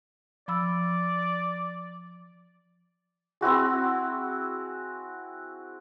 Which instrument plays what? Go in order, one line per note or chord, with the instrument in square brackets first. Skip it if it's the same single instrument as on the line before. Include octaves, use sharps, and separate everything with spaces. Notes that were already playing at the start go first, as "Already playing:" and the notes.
[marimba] F3 B5 E6 [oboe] D5
[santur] C4 E4 F#4 G#4